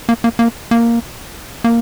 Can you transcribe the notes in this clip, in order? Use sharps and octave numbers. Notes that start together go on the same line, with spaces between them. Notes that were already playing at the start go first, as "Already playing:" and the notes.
A#3
A#3
A#3
A#3
A#3